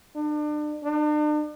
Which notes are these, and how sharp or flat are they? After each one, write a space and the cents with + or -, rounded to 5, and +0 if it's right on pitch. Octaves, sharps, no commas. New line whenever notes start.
D4 +35
D4 +45